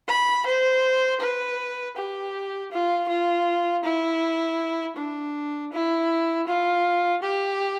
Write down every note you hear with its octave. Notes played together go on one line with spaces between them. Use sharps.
B5
C5
B4
G4
F4
F4
E4
D4
E4
F4
G4